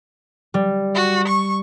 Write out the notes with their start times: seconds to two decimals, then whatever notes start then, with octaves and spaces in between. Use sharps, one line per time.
0.54 G3
0.95 F#4
1.27 C#6